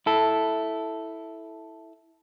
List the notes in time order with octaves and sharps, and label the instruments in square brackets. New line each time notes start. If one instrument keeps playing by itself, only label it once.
[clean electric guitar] E4 A4